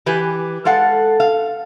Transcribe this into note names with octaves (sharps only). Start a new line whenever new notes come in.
E3 G4 B4 G#5
G#3 A4 F5 F#5
F5